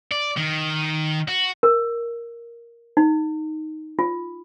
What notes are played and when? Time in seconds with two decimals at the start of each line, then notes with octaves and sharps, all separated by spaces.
0.12 D5
0.37 D#3
1.28 F#4
1.63 A#4
2.97 D#4
3.99 F4